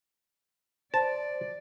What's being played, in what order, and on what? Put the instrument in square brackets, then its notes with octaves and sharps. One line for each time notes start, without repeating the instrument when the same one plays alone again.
[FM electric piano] C5 [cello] D5 [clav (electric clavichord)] A5